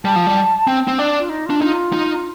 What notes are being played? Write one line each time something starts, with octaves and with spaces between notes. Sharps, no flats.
G3 A5
F3
G3
C4 G5
C4
D4 D5
F4
D#4
D4 F4
D#4 F4
D#4